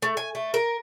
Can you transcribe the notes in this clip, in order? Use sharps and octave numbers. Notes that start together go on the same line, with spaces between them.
A3
G#5
A3
A#4